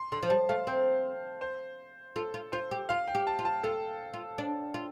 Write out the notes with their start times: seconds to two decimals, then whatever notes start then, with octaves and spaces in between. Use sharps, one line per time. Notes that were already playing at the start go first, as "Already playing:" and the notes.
Already playing: C6
0.12 D3 C6
0.23 F3
0.30 G3 A5
0.49 A3 F5
0.67 C4 C5
1.41 C5
2.16 F4 A4
2.34 F4
2.52 F4 C5
2.71 G4
2.89 F4 F5
3.08 G5
3.15 G4
3.27 A5
3.39 F4
3.45 A5
3.63 F4 A4
4.14 F4
4.38 D4
4.74 F4